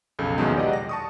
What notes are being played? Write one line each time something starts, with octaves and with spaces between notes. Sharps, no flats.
B1 F2 C#3 A4
A#1 E2 B2 D#3 F#3 G#3
G4 D5 D#5 F#5
A#6
A5 C#6 D#6